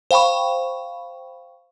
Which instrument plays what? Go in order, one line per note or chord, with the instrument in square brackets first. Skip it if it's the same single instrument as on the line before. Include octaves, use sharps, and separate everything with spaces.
[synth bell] C5 F5 G5 B5 C#6